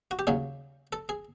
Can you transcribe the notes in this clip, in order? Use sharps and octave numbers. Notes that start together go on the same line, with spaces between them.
F#4
G4
D#2 C#3 F#3 G#4
A4
G#4